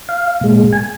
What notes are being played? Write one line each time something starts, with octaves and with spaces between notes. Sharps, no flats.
F5
A#2 G#3
G#5